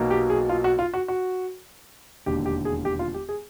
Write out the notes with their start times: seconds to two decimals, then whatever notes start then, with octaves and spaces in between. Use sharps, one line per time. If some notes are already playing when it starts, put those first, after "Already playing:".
Already playing: B1 B2 F#3 A#3
0.10 G4
0.30 G#4
0.49 F4
0.64 F#4
0.79 F4
0.93 F#4
1.08 F#4
2.26 E1 D#2 D3 G4
2.46 G4
2.65 G#4
2.85 G4
2.99 F4
3.14 G4
3.29 G#4